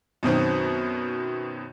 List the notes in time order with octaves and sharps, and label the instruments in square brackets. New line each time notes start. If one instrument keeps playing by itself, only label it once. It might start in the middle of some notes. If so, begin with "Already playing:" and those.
[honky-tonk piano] F#2 B2 D#3 C4